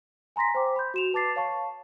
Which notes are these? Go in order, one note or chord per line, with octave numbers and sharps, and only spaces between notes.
G#5 A#5 C6 A#6 B6
C5 G5 D6
B5 C6 G6
F#4 E7 F7
B4 A5 D6 A6 C7
C#5 F5 A5 C#6